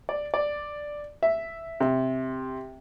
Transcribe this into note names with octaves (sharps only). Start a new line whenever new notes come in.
D5
D5
E5
C3